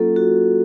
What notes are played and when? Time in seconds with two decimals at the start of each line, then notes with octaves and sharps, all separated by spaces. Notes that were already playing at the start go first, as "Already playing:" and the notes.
Already playing: F#3 A#3 C#4 F4 A4
0.16 F#4